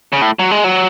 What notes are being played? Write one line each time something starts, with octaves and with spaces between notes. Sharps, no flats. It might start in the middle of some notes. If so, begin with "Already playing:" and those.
C#3
A2
F#3
G#3
F#3